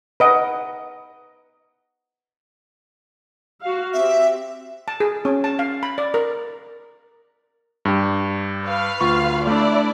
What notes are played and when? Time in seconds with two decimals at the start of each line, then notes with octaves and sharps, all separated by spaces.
0.20 B4 D#5 F#5
3.61 F#4 F5
3.93 C4 G4 E5
4.88 A5
5.00 G#4
5.25 C#4
5.44 A5
5.59 F5
5.83 B5
5.98 D5
6.14 A#4
7.85 G2 G4
8.65 B4 F5
9.01 D2 F4 C#6
9.47 A3 D4 E4 D5